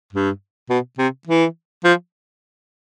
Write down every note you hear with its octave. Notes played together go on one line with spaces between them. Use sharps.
G2
B2
C3
E3
F3